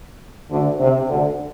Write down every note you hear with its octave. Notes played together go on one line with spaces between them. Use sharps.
D2 D3
C3
D2 D3